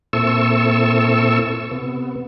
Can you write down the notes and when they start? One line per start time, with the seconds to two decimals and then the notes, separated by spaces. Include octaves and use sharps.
0.13 A#2 C4 E4 A4 C#6 E6
1.71 C3 B3